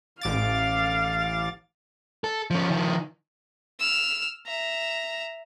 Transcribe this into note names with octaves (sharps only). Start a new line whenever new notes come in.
A1 F5 D6 A6
A4
F3 C#4
D#3 F3
E6 F6
E5 A#5